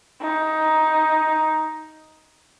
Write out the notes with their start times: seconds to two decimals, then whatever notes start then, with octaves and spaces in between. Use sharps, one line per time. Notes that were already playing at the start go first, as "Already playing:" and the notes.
0.21 D#4